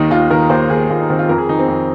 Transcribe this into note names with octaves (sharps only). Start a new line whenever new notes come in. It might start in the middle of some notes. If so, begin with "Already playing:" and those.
Already playing: D#2 D#3 D#4
D#2 F4
D#3 A#4
D#2 C5
D#3 G#4
D#2 F4
D#4
D#3 C4
F4
F2 A#4
G#4
D#3 D#4
C4
F2